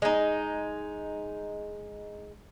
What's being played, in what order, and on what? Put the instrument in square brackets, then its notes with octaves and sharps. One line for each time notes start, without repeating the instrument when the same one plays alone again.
[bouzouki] G#3 D#4